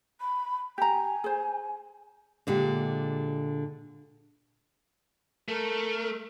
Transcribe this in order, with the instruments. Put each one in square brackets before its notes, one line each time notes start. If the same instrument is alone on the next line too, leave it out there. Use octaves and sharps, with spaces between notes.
[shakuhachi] B5
[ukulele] G4 A#5 [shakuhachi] G#5
[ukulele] G#4 C5
[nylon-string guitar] A#2 D3 G#3 G4
[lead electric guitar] A3 [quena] A#4